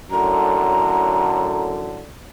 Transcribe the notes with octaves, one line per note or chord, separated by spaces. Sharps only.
F#2 A2 D3 A#5